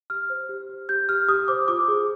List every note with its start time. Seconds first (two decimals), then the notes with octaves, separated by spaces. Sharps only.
0.10 G4 F6
0.30 C5
0.49 G4
0.69 G4
0.89 G4 G6
1.09 G4 F6
1.28 G4 D#6
1.48 C5 D6
1.68 F4 D6
1.88 G#4